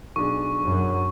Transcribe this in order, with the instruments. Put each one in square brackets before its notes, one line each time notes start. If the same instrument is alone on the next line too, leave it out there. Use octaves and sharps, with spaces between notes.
[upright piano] B1 D4 G#4 [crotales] C#6
[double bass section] F#2 F#3